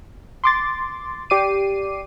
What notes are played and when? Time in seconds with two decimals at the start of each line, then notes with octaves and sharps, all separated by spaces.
0.44 C6 D6 A6
1.30 G4 D5 D6 C7 D#7